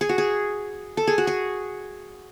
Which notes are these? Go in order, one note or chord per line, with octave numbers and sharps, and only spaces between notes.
G#4
F#4
G#4
A4
G#4
F#4
G#4